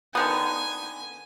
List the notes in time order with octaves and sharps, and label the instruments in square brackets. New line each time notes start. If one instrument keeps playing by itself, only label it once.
[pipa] D3 D#3 B3 [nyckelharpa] G#5